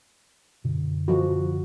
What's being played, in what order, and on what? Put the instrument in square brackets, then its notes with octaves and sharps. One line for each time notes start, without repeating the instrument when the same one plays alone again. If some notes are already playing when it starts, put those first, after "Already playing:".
[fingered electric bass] F#2 B2 D3
[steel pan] F3 F#4